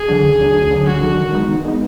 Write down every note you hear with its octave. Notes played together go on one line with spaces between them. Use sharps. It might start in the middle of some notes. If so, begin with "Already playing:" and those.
Already playing: G#4
D3 F#3 D4
D2
D3 F#3 D4
D2
D3 F#3 D4
D2 F#4
D3 F#3 D4
D#3
G#3 B3 D#4
D#3
G#3 B3 D#4